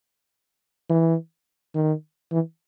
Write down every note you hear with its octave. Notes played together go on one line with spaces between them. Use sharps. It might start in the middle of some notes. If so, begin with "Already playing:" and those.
E3
D#3
E3